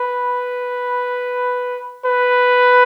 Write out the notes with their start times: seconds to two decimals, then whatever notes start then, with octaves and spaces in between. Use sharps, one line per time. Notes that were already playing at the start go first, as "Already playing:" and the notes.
Already playing: B4
2.06 B4